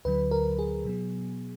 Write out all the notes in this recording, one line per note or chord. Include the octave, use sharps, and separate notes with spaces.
D2 D3 F#3 B4
A#4
G#4
B2 F#3 B3